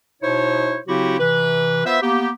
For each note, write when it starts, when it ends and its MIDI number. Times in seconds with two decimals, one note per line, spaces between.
0.22 0.78 47
0.22 0.78 63
0.22 0.78 64
0.22 0.78 72
0.22 0.78 73
0.87 1.20 49
0.87 1.20 54
0.87 1.20 60
0.87 1.20 64
0.87 1.20 66
0.87 1.20 67
1.20 1.83 48
1.20 1.83 52
1.20 1.83 71
1.85 1.98 59
1.85 1.98 65
1.85 1.98 71
1.85 1.98 72
1.85 1.98 76
2.02 2.30 58
2.02 2.30 59
2.02 2.30 67